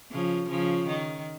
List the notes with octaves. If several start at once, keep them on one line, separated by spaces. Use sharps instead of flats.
C#3 F3
C#3 F3
D#3